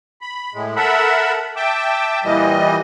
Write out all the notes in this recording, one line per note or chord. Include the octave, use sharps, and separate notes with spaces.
B5
A2 G#3
A4 A#4 E5 F#5 B5
E5 G5 A5 D6
A#2 E3 G3 D#5